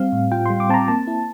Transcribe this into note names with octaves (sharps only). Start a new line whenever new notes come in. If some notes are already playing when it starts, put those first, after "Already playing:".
Already playing: G3 C4 F5
A2
F4 G5
G3 C6
D6
C4 A5 A#5
A#3 A5
E4